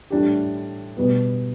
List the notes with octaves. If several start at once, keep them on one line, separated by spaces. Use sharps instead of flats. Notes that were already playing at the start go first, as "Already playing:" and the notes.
A2 G3 D4 G4
B2 G3 B3